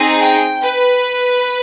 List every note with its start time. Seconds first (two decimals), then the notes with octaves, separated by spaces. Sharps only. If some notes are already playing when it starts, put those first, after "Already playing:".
Already playing: C4 D#4 G#4
0.20 G5
0.62 B4